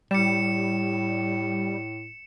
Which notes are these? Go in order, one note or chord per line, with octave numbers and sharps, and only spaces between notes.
A2 G3 C#7 E7